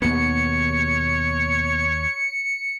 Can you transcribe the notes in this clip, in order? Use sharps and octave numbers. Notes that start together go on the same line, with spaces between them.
D#2 B2 A#3 B3 C#5 C#7